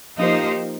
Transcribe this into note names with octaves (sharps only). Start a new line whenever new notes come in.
F3 A#3 D#4 G4 C5